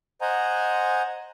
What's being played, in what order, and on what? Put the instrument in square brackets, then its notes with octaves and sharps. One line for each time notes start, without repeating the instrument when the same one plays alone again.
[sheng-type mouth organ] C5 D#5 F#5 G#5 A#5